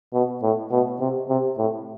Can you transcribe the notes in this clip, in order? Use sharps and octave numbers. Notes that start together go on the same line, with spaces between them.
B2
A2
B2
C3
C3
A2